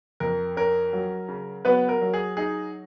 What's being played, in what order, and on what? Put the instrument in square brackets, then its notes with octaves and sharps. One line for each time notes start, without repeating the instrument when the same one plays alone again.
[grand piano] F2 A#4
C#4 A#4
F#3
C#3
F#3 B3 B4
A#4
F#3
G#4
D#4 G#4